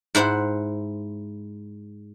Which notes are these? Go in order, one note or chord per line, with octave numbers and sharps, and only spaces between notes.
G#2 E4 C5 F#5